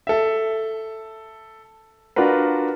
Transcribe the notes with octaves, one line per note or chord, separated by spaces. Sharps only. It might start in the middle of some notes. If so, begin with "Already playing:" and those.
A4 E5
D4 F4 F#4 A#4 B4